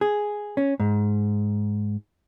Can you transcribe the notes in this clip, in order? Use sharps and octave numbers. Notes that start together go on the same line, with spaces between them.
G#4
C#4
G#2